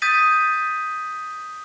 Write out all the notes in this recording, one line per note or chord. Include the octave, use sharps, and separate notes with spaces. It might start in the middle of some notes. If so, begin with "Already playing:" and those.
D#6 G6 A6 B6 D#7